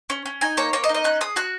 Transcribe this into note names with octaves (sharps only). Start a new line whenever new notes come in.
C#4
C#4
D#4 G#5
A#3 C#5
A#3 C#5
D#5
D#4
D#5
C#4 F#6
G#4 D#6
F#4 F#6